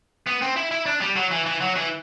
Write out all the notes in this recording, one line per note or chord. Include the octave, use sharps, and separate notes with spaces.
B3
C4
E4
E4
D4
G3
F#3
E3
E3
F#3
E3